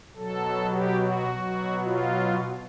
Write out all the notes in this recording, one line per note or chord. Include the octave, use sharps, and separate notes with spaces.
B2 F#3 A4
G4
F#4
B2 F#3
F4